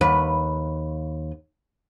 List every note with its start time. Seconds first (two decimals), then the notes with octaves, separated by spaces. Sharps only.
0.01 D#2 B4